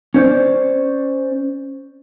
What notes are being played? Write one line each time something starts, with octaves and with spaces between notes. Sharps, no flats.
C#4 C5 D5